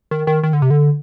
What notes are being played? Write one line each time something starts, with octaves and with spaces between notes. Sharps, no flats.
D#3
D#3
D#3
D3
C3
D3